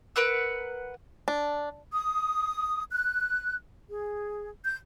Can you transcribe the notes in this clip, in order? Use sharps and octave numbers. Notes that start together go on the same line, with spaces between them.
A#4 B4 F#5 E6
D4
D#6
F#6
G#4
G6